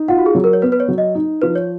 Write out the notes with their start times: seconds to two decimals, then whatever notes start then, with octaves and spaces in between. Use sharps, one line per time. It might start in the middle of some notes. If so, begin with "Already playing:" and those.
Already playing: D#4
0.08 F4 F#5
0.18 F#4
0.26 G#4
0.35 F#3
0.44 A#4
0.53 C#5
0.62 B3 B4
0.72 B4
0.80 C#5
0.88 F#3
0.98 D#5
1.15 D#4
1.42 F3 B4
1.56 C#5